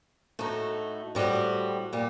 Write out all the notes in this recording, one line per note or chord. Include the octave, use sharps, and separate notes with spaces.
A2 A3 D#4 F#4
A2 G3 C4 F#4
A#2 G3